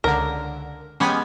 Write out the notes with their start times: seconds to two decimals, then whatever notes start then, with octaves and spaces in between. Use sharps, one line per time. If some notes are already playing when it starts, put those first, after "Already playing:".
0.04 C#2 D3 A#4
1.00 G#3 B3 C#4 G4 G#5